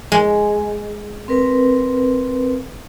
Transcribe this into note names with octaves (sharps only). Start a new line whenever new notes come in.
G#3
C4 A#4 B4